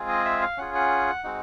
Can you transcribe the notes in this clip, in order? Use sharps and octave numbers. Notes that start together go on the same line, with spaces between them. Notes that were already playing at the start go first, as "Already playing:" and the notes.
Already playing: G#3 C4 F4 G#4
D#5
E5
F5
C#4 F4 G#4 F#5
F#5
G#3 C4 D#4 F#4